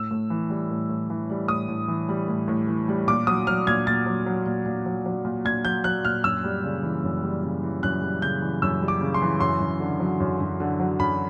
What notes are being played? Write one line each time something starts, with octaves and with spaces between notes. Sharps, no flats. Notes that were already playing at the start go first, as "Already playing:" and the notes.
Already playing: A2 E6
A2
E3
G3
A2
A2
E3
G3
A2 D#6
A2
E3
G3
A2
A2
E3
G3
A#2 D6
F#3 D#6
F#3 F6
A#2 G#6
A#2 A6
F#3
F#3
A#2
A#2
F#3
F#3
A#2
A#2 G#6
F#3 G6
F#3 F#6
A#2 F6
F#2 E6
G3
C#3
E3
F#2
G3
C#3
E3
F#2 F#6
G3
C#3 G6
E3
F#2 E6
G3
D6
C#3
C6
E3
F#2 C6
F#2
D3
F#3
F#2
F#2
D3
F#3
F#2 B5